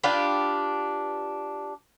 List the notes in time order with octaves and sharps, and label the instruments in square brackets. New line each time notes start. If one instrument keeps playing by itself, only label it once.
[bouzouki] D4 F4 G4 B4